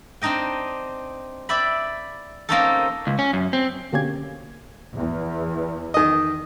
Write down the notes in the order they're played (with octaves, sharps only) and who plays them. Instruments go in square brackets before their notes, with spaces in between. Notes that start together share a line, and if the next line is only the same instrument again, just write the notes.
[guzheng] C4 D4 D#4 D#5 G5
D5 E5 G5 B5
A#3 C4 C#4 D#4 G4 A4
[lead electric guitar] C#2
C#4
F#2
C4
[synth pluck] B2 D3 A#3 C#4 G4 G#6
[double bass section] E2
[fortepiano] D#3 D#5